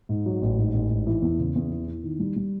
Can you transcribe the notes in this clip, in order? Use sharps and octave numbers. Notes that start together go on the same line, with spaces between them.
G#2
F#3
A1
G#2
A1
G#2
E3
E2
C#3
E2
E3
E3
D#3
G3
G3